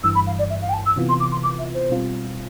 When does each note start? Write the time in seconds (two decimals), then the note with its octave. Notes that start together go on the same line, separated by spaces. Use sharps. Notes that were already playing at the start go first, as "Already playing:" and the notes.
0.03 G1 G2 E3 E6
0.15 B5
0.27 F5
0.39 D5
0.50 E5
0.62 F5
0.69 G5
0.73 A5
0.86 E6
0.96 C3 E3 B3 F4
1.09 C6
1.20 D6
1.32 C6
1.43 D6
1.59 E5
1.74 C5
1.90 B2 G3 C4 F4